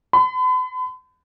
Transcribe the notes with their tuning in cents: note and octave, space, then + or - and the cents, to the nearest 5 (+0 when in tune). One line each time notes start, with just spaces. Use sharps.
B5 +40